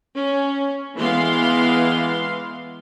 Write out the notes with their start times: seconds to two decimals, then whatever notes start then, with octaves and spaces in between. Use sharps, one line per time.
0.15 C#4
0.96 E3 G#3 B3 F5 C6